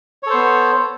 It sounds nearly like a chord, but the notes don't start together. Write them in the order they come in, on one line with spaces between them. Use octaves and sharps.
C#5 A4 C5 B3